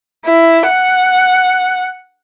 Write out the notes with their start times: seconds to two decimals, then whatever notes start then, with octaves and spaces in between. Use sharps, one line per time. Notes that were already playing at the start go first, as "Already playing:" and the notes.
0.25 E4
0.67 F#5